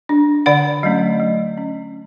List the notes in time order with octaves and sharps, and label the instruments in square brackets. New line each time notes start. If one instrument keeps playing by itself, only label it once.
[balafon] D4
D3 D5 F#5
F#3 A3 C#4
F#3
C#4